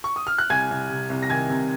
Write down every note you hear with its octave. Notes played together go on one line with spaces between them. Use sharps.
C#6
D#6
F6
F#6
C2 G#5 G#6
C2
C3
C2
A#6
D#3 G#5 G#6
C3